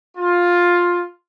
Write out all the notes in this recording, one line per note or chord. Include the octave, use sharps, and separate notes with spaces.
F4